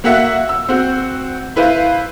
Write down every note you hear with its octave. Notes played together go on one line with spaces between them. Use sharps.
A#3 F#4 E5 F#5
E6
C4 F#4
E4 B4 C5 F5